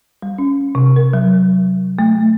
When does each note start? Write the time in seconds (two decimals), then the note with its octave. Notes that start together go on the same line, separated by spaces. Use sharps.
0.22 G3
0.38 C#4
0.75 C3
0.96 A#4
1.13 F#3
1.99 A3